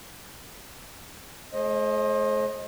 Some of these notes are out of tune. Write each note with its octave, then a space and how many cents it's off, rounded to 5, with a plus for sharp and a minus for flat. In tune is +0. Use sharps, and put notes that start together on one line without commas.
G#3 +45 C5 +35 D#5 +0